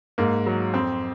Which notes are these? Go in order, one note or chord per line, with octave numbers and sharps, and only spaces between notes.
G#2 A#3
F#3
F2 C4